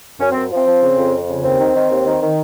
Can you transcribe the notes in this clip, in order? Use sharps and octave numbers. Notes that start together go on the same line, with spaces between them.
F#2 C#4
F#2 C4
F3
C4
F3
C#3
F2
F2
C#3
D#2 C4
D#3
D#3
D#2
D#3
D#3